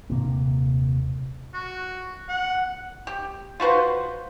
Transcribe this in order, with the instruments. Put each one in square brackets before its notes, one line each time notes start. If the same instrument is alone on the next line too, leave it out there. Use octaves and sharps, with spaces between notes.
[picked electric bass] D#1 C3 A#3
[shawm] F#4
F#5
[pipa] G4
F4 F#4 B4 C5